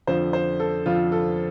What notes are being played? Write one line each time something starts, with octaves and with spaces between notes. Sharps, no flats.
F2 D3 F3 C5
C5
A4
F2 D3 F3 F4
A4